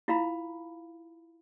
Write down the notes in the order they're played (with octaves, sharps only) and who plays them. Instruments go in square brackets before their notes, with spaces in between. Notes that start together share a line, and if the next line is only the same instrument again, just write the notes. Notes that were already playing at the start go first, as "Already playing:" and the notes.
[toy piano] E4 F4 F5 A#5 B5